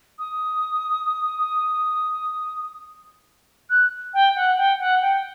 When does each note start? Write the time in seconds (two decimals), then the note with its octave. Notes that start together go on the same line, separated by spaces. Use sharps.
0.18 D#6
3.70 F#6
4.14 G5
4.36 F#5
4.57 G5
4.79 F#5
5.02 G5